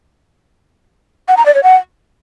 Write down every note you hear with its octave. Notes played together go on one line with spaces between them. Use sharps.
F#5
A#5
D5
C#5
F#5